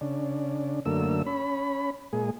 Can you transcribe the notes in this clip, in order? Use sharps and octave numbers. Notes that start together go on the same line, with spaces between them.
C#3 D4
F#2 D3 A3 A#3 E6
C#4 B5
A#2 G#3 G#4